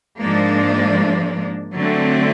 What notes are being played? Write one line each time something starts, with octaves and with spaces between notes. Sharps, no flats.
G#2 F3 A#3 D4
D3 F#3 A3 C4